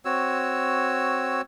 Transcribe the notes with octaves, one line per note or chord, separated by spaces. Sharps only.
C4 F#4 C#5 E6